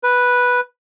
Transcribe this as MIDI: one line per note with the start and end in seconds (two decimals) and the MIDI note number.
0.03 0.60 71